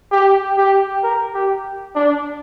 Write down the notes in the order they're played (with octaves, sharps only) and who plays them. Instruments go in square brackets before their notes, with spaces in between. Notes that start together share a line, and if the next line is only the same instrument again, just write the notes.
[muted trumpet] G4
G4
A#4
G4
D4